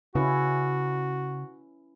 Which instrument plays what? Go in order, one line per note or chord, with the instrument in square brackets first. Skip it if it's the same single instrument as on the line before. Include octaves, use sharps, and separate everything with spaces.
[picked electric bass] C#3 [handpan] C#4 E4 B4 [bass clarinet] F#4